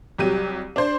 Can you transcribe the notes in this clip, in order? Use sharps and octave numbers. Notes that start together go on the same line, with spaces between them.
C2 F#3 G4 D#7
D4 C5